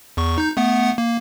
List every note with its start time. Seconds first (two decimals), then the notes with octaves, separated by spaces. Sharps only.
0.17 E2 C#6
0.38 D#4 G6
0.57 A3 B3 F#5
0.98 A#3